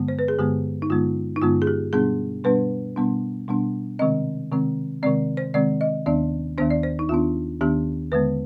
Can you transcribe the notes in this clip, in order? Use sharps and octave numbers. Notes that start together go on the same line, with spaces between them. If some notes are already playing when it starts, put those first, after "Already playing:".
Already playing: G2 D3 G#3 B3
C5
B4
G#4
G2 D3 G#3 B3 G4
D#4
G2 D3 G#3 B3 F4
D#4
G2 D3 G#3 B3 F4
G#4
G4
B2 G3 B3 D4 G#4
B2 G3 B3 D4 B4
B2 G3 B3 D4
B2 G3 B3 D4
C3 D#3 G#3 C4 D#5
C3 D#3 G#3 C4
C3 D#3 G#3 C4 D5
C5
C3 D#3 G#3 C4 D5
D#5
D#2 D#3 B3 D4 D5
D#2 D#3 B3 D4 C5
D5
C5
D#4
D#2 D#3 B3 D4 F4
D#2 D#3 B3 D4 G4
D#2 D3 G#3 B3 B4